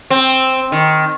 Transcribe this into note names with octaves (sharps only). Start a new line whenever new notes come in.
C4
D#3